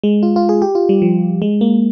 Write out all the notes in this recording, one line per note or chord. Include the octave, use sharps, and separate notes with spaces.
G#3
F4
F4
G#4
G4
F4
G3
F3
G#3
A#3